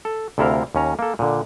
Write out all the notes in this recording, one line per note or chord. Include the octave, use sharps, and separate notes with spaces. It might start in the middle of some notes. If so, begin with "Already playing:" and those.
A4
D2 C3 E4 A4 A#4 F5
D#2 C#4 A#5
A#3 A4
A#2 D3